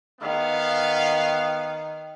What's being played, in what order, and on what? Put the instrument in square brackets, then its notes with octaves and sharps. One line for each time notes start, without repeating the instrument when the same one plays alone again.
[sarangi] D#3 [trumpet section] B3 F5